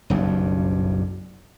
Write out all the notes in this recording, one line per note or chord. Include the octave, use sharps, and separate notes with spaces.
F#1 B1 G2